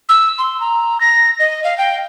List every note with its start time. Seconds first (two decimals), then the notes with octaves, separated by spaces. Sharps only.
0.09 E6
0.39 C6
0.60 A#5
1.01 A#6
1.40 D#5
1.64 F5
1.78 G5